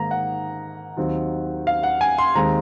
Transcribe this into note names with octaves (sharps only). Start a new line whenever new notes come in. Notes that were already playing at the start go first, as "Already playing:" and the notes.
Already playing: G#2 D#3 A#3 A#5
F#5
D#2 D#3 F#3 C4
F5
F#5
G#5
C6
D#2 D#3 G#3 C4 A#5